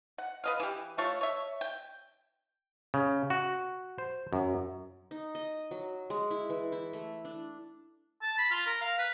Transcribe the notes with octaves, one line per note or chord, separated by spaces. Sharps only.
F#5
B4 D#5 F5
E3 G4
A3 F4 C#5
C#5 E5
G5
C#3
F#4
C5
F#2
D#4
D#5
F#3
G#3
E4
E3
E4
A3
D4
A5
B5
F4
A#4
F5
B4